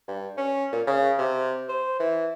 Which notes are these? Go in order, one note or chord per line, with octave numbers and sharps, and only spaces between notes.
G2
C#4
A#2
C#3
C3
C5
E3